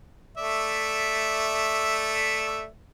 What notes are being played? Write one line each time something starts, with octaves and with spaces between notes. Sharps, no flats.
A3 D5 E5